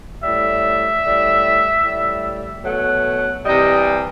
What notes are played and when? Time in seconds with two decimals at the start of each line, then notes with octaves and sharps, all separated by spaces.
0.22 A2 G3 E5
1.03 A2 G3
1.83 A2 G3
2.64 B2 F#3 A3 F#5
3.44 C3 E3 G3 D#5